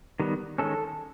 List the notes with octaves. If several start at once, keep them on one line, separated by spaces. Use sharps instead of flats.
D#3 G3 B3
D#3 G#3 C#4 A4